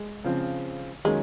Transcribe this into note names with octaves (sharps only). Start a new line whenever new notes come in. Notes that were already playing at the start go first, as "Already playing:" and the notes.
Already playing: G#3
C#3 F3 C4
D#3 F#3 G#3 A#3 C#4